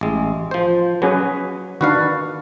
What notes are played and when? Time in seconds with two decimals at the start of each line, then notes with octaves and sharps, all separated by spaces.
0.01 A1 G#3
0.51 F3 C5
1.02 F#3 C#4 G#4 B4
1.81 D#3 D4 F#4 B4 F5